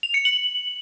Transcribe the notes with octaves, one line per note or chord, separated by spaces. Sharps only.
F7
C#7
F#7